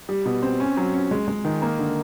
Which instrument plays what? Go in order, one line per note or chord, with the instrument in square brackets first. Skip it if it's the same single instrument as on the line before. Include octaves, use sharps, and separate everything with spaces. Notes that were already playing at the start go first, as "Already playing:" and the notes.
[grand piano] G3
B2
C4
C#4
F#3
C#4
G#3
G#3
D#3
A#3
D3